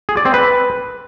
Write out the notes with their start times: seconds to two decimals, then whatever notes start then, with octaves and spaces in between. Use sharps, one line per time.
0.09 G#4
0.17 D5
0.25 C4
0.34 B4